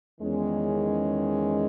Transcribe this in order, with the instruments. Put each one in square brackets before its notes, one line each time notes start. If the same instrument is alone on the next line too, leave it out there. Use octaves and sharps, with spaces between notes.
[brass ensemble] E2 D#3 G#3 C#4